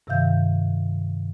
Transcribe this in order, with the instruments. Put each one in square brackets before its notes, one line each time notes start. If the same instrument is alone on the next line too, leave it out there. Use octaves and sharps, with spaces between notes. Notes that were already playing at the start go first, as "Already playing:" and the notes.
[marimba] G2 C3 D#3 E5 F5 G6